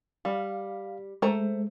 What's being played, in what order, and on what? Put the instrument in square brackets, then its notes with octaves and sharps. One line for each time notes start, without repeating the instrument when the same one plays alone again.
[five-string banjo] G3 [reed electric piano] F5
[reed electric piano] G#3 [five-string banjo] A3 C5 A#5